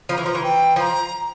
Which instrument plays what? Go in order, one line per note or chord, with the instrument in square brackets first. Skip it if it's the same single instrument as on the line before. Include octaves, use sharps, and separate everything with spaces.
[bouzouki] F3 [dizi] C6
[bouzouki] E3 [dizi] A#5
[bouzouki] F3
E3
[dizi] G5
[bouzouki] F3 [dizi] C6
[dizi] A#5